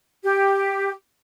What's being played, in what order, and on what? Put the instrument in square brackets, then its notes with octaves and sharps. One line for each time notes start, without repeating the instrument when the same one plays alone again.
[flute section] G4